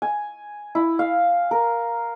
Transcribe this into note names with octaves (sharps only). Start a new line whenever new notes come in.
G#5
E4
F5
A#4